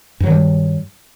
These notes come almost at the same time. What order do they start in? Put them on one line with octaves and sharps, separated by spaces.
G2 F#3 D#3 G3